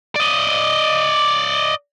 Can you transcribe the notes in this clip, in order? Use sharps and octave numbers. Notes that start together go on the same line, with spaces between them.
D5 D#5